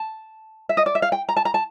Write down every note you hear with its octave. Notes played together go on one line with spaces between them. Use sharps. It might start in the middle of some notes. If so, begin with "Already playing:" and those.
Already playing: A5
E5
D#5
D5
E5
F5
G5
A#5
A5
A#5
A5